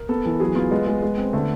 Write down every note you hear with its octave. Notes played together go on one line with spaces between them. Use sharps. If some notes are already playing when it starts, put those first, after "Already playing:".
Already playing: A#4
B3 A4
E3
F#3 G#4
B3 F4
G#3 B3
G#3
G#3
C4
D3 A3